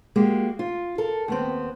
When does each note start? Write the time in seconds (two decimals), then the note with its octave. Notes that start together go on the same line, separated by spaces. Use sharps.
0.16 G#3 A#3 F#4 G4
0.59 F4
0.98 A4 A#4
1.28 D#2 B3 C4